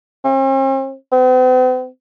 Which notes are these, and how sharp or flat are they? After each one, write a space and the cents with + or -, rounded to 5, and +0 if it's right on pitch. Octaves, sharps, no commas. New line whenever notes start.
C4 +45
C4 -45